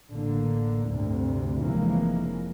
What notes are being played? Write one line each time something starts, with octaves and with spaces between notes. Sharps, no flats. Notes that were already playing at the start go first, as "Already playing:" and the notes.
A1 D3 A#3
D2 G2 C3
F1 C#3 E3 F3 G#3 A#3